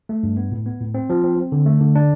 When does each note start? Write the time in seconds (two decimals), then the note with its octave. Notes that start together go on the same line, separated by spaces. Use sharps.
0.09 A3
0.23 G2
0.37 B3
0.52 A2
0.66 B3
0.80 A2
0.94 C4
1.10 F3
1.24 C4
1.37 C4
1.52 D3
1.66 A3
1.81 D3
1.95 D4